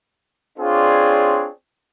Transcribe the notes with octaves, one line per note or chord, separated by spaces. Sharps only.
C4 D4 F4 G#4 C#5 D5